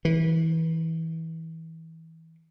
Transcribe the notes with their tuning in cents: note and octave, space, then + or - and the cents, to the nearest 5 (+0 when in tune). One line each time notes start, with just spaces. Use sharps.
E3 -25